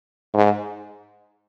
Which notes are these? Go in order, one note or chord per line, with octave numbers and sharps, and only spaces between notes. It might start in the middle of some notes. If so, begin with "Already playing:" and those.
G#2